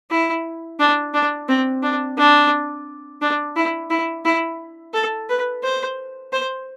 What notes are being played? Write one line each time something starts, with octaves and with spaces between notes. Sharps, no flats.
E4
D4
D4
C4
D4
D4
D4
E4
E4
E4
A4
B4
C5
C5